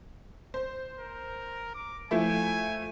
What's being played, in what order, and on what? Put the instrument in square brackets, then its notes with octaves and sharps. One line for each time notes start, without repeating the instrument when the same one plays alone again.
[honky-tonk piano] C5
[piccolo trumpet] A#4
D6
[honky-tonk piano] F3 A3 E4 [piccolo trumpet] G#5